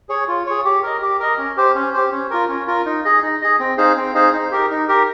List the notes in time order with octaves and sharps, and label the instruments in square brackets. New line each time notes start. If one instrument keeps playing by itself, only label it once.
[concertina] G#4 C#5
F4
G#4 C#5
G4
A#4 D#5
G4
A#4 D#5
C#4
G4 C5
C#4
G4 C5
C#4
F4 A#4
C#4
F4 A#4
D#4
G#4 D#5
D#4
G#4 D#5
C4
D#4 G#4 C5 F5
C4
D#4 G#4 C5 F5
D#4
G4 A#4
D#4
G4 A#4